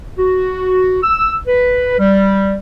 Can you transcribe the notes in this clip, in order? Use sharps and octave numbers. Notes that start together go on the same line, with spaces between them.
F#4
E6
B4
G3